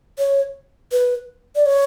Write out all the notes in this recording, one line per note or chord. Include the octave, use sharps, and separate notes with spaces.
C#5
B4
D5
C#5